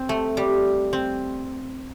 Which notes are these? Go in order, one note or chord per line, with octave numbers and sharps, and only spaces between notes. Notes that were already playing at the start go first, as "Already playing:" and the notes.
Already playing: C4
A3
G3
C4